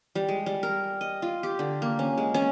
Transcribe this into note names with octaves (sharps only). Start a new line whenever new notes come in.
G3
G#3
G3
A#4
D#5
F4
G4
D3
A#3
C#4
G#3
C#4